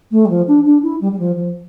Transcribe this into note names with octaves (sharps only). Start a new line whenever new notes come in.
A3
G3
F3
D4
D4
E4
G3
G3
F3
F3